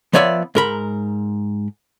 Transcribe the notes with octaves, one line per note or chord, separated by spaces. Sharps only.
F3 B3 C#5 D5 E5
G#2 A#4 B5